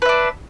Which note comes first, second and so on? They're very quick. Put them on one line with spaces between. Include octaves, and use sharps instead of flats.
B4 E5 D4